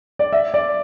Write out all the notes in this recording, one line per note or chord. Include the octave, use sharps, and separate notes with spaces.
D5
E5
D5